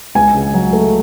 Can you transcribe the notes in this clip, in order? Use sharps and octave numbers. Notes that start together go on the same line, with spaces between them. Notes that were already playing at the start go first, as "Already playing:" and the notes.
C#2 G#5
C#3
F#3
A3